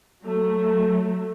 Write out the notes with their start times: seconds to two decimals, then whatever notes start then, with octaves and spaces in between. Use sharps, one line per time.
0.23 F#3 A3